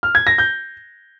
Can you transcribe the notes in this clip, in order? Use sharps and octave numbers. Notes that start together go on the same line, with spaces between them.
F6
G#6
A#6
G6